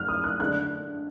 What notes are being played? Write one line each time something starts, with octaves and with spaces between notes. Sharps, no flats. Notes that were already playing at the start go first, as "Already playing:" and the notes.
Already playing: F#2 F6 F#6
D#6
F#6
D3 G#3 D4 F#6